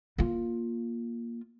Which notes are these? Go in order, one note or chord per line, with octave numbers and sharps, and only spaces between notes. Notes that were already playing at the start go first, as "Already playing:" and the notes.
A#3 F4